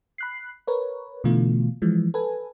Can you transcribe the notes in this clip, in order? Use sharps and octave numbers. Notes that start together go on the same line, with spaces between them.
B5 F#6 C7
A#4 B4 C#5
B2 D3 E3 A3 F4
E3 F3 G#3
A4 B4 G#5